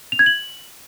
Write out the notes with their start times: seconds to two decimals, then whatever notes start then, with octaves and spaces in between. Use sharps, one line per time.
0.12 F7
0.19 G#6
0.26 F#7